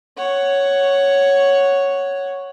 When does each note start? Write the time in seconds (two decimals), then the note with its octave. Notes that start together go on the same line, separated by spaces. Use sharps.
0.17 C#5 F#5